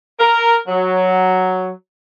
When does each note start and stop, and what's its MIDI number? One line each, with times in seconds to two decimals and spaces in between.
0.18 0.57 70
0.68 1.69 54